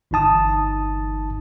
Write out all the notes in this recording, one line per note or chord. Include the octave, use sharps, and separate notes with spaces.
G1 E3 D#4 A5 D#6